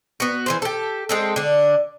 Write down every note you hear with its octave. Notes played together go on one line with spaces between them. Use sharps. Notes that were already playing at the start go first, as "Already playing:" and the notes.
B3 F#4
E3 F#3 C5
G4 A4
G#3 C4 A4
D3 D4